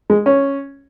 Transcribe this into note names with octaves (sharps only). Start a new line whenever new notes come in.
G#3
C#4